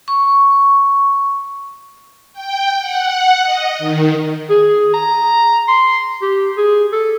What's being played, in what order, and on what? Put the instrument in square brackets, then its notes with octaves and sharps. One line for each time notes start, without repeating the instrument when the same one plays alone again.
[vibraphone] C#6
[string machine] G5
F#5
D#5
D#3
[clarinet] G#4
A#5
C6
G4
G#4
A4